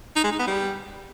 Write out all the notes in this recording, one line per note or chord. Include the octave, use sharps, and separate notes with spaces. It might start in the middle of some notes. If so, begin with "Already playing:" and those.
D#4
G#3
D#4
B3
G3